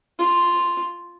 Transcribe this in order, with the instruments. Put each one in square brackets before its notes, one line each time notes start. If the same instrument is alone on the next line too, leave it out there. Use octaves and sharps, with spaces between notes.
[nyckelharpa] F4